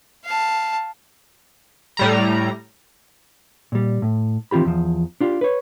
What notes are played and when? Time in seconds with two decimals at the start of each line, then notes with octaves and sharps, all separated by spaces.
0.25 F5 A5
1.97 A2 G3 A#5
3.72 A#2 G3
4.02 A2
4.51 E3 C4 F4 G4 B5
4.65 E2 F3
5.21 D4 F4 G4
5.41 B4 C#5